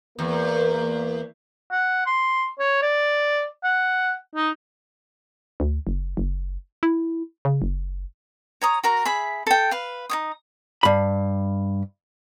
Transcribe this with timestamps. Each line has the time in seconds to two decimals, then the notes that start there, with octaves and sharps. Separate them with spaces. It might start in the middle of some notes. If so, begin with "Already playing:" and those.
0.19 E2 A#3 A#4
1.71 F#5
2.06 C6
2.59 C#5
2.82 D5
3.64 F#5
4.35 D#4
5.60 D2
5.87 F#1
6.17 F#1
6.83 E4
7.45 C#3
7.62 F#1
8.62 C#5 A#5 D#6
8.84 F#4 A#4 A#5
9.05 G#4 E5 B5
9.47 A4 G5
9.71 B4 F5
10.10 D#4 C#5 D#6
10.83 G2 B5